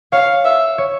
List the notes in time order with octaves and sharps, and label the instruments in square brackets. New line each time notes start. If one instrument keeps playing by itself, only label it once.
[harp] C#5 [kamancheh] F5
[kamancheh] E5
[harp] C#5